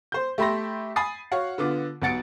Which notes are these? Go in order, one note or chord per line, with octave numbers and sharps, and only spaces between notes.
C5 G6
A3 G4 E5 B5 C6 A#6
G#5 B5 D#6 A6 C7
F#4 C#5 F5 F#5
D3 B3 F4 D6
B1 B2 F#5 A6 C#7 D7